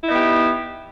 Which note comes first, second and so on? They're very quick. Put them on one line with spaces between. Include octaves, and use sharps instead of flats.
E4 D#4 B3 G4